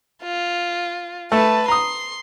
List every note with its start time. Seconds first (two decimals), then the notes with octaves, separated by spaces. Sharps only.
0.24 F4
1.32 A3 B4 A5
1.68 A#5 C6 D#6